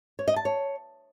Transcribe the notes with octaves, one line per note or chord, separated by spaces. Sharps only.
C#5
D#5
A5
C#5